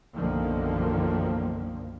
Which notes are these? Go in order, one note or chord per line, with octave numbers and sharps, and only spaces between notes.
B1 F#2 D3 D#3 F3 A#3